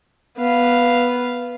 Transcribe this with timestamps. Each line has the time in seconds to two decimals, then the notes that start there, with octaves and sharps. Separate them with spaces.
0.38 B3 F5